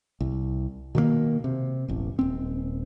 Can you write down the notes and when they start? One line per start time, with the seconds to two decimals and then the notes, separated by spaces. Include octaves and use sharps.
0.21 C2
0.95 B2 D#3 F#3 A#3
1.44 C3
1.88 E1 A1
2.19 D#1 C4